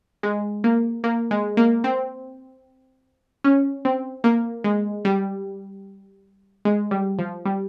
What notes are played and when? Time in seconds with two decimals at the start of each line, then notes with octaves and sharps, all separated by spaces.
0.23 G#3
0.64 A#3
1.04 A#3
1.31 G#3
1.57 A#3
1.84 C4
3.44 C#4
3.85 C4
4.24 A#3
4.64 G#3
5.05 G3
6.65 G#3
6.91 G3
7.19 F3
7.45 G3